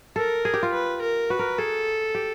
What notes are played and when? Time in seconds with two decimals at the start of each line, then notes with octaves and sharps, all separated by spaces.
0.16 A4 A#4
0.45 G#4
0.54 G4
0.63 F4
0.73 B4
1.02 A#4
1.30 F#4 B4
1.39 A#4
1.58 G#4 A4
2.15 G4